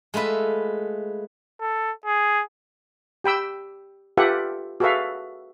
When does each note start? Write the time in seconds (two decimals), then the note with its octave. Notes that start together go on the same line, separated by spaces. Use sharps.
0.14 G#3 A3 F4 B4 E5
1.61 A4
2.06 G#4
3.24 G4 G5 B5 E6
4.17 F4 G4 A4 B4 E5 F#5
4.80 F#4 G#4 A4 B4 E5 F5